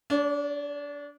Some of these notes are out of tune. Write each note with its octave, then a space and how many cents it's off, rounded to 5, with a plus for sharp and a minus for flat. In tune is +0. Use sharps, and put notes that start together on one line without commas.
D4 -25 C#5 +25